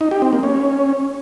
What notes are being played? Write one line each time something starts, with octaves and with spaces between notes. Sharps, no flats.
D#4
G4
C4
A#3
C#4